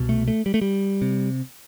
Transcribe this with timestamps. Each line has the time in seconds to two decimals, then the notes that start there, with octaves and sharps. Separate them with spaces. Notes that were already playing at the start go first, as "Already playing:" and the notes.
Already playing: C2 B2
0.09 A3
0.28 A3
0.46 G3
0.54 A3
0.61 G3
1.02 C3